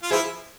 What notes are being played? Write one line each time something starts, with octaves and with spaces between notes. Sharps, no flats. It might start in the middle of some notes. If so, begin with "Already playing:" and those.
F4
F3 G#3 E4